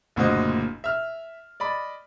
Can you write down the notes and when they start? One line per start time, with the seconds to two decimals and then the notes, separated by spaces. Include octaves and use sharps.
0.16 F#1 D2 A#2 F#4 C5 D#5
0.84 E5 F6
1.60 D5 D#5 B5